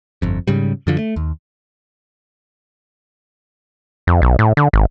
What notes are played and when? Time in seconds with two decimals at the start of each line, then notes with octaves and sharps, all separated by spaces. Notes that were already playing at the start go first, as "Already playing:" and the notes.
0.22 G1 F2
0.48 G#2 C#3 G3
0.87 F#2 D3 F3
0.98 A3
1.16 D#2
4.07 F2
4.22 B1
4.39 A2
4.57 D3
4.73 G#1